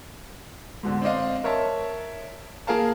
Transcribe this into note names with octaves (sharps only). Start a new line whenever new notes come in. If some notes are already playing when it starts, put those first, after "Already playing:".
G#2 B2 D3
C4 D4 D5 D#5 F5
A#4 C#5 E5 A5
A#3 G#4 A#4 F5 A5